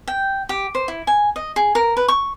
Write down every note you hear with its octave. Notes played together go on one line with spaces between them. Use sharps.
G5
G4
C5
E4
G#5
D#5
G#4
A#4
B4
C#6